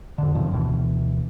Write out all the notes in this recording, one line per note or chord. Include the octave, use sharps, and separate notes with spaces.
F2 D3
F#2 C3 D#3 F3
D2 B2 E3